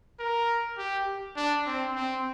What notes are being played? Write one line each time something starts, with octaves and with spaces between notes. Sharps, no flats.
A#4
G4
D4
C4
C4